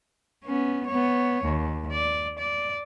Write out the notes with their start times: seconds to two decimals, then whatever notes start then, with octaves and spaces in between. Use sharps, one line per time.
0.44 B3 C#4
0.87 B3 C#5
1.44 D#2
1.92 D5
2.38 D5